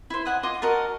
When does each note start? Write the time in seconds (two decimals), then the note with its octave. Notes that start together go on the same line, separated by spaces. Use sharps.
0.10 E4 C5
0.25 D#5 F#5 G#5
0.43 F4 D#5 C6 D6
0.62 F#4 A#4 D#5 A5